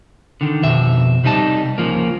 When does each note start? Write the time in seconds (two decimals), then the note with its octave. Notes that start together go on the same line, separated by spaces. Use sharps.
0.41 D3 D#3
0.62 F2 B2 E5
1.24 C3 G3 D#4 D#5 A5
1.78 C#2 C#3 F3 A#3